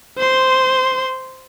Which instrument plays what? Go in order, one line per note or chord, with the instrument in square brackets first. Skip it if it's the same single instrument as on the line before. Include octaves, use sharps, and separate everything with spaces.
[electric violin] C5 C6